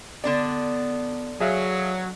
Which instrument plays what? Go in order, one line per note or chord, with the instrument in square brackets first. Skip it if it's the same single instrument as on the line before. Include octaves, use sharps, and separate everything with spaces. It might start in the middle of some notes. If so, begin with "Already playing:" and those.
[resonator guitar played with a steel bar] D3 D4 D5 [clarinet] B3
[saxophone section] F#3 [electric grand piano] G#4 E5 F5